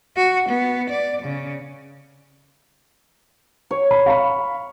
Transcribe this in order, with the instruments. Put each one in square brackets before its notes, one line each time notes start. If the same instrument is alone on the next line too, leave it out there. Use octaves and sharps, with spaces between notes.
[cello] F#4
B3
D5
C#3
[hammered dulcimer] C#5
[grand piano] B5
F5 B5